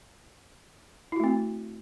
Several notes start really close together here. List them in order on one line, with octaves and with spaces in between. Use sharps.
E4 F#4 A3 C4